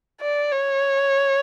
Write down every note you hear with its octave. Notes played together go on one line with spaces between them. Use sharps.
D5
C#5